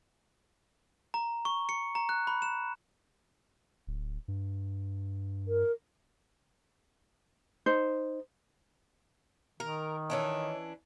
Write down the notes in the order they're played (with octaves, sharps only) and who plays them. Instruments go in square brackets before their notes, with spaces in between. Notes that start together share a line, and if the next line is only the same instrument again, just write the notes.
[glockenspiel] A#5
C#6
C#7
A#5
F#6
B5
E7
[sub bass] D1
G2
[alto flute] A#4
[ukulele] D#4 C5
[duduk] D#3 [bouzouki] A#4
[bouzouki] E3 C#4 D4 [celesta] C#5 D#5